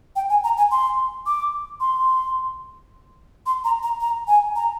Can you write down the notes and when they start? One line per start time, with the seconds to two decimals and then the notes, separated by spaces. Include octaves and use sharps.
0.16 G5
0.30 G#5
0.44 A#5
0.58 G#5
0.71 C6
1.26 D6
1.80 C6
3.46 C6
3.64 A#5
3.83 A#5
4.01 A#5
4.28 G#5
4.56 A#5